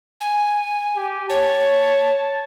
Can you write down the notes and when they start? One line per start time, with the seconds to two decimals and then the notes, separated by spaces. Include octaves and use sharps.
0.21 G#5
0.96 G4
1.30 C#5 A5